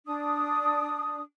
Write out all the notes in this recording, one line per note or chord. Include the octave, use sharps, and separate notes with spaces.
D4 D#6